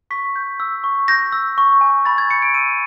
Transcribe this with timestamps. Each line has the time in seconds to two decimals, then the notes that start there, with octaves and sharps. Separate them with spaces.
0.11 C#6 B6
0.36 G6
0.60 E6
0.84 C#6
1.08 G6 A#6
1.32 E6
1.58 C#6
1.81 G#5
2.05 B5 A6
2.18 G#6
2.31 G6 C#7
2.42 D7
2.54 E6 D#7